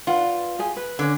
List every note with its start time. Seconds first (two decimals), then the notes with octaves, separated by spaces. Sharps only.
0.07 F4 B4 D5 F#5
0.59 G4 G#4 G#5
0.77 B4
0.99 D3 C#4